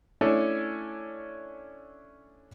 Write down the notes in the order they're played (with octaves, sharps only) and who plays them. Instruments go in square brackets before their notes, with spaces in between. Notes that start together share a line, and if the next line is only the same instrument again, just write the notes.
[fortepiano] A3 C#4 D4 E4 A4 C#5